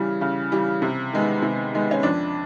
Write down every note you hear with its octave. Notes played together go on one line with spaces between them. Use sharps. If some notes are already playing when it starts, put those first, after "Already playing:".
Already playing: C#3 E3 G3
C#3
E3 G3
C3
D#3 G#3 B3
C3
D#3 G#3 B3
C#4
F2 D4